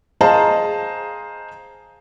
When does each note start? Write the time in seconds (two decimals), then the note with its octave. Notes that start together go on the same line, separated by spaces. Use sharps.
0.21 G#4 C5 D#5 F5 A5 A#5